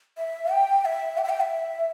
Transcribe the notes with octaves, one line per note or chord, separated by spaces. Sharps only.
E5
G5
E5
G5
E5
G5
E5